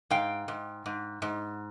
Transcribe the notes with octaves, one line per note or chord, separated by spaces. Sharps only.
G#2 F5 G5
G#2
G#2
G#2